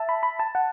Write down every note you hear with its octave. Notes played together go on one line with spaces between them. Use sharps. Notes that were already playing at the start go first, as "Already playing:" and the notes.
Already playing: E5 A5
B5
B5
A5
F#5